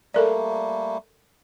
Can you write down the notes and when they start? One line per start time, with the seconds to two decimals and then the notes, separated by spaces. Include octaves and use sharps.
0.14 G3 A3 A#3 A4 A#4 D5